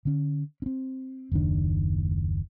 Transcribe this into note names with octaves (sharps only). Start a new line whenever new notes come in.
D3 C#4
C4 C#4
F#1 D#2 D#3 D4